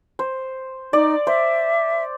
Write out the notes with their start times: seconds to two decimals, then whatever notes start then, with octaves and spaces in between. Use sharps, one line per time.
0.19 C5
0.93 D#4 D5
1.27 C5 E5